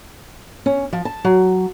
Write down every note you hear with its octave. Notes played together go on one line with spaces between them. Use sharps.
C#4
F3
A5
F#3